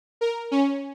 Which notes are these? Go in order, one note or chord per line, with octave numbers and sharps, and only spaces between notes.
A#4
C#4